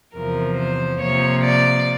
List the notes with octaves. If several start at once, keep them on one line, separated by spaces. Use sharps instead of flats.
E2 C3 F3 A#4
C5
C3 F3 A#3 C#5
D5